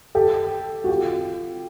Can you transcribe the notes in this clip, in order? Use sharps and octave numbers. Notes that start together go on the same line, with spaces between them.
G4 A4
F#4
F4 G4